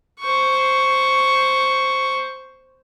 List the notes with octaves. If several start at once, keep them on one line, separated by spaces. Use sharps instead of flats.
C5 C#6